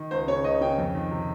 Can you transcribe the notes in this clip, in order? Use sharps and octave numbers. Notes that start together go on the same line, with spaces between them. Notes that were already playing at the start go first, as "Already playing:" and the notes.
Already playing: D#3
C#2 C5
C#3 C#5
C#2 D#5
C#3 G5
F2
D#3
C3